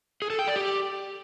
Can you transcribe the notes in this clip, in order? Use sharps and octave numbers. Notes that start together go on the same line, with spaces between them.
G#4
A4
G5
D5
G4